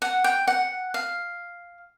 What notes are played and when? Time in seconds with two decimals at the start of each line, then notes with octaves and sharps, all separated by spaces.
0.02 F#5
0.24 G5
0.47 F#5
0.94 F5